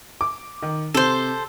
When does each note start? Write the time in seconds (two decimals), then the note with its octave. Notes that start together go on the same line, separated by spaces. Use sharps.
0.21 D6
0.62 D#3
0.94 C3 A4 C5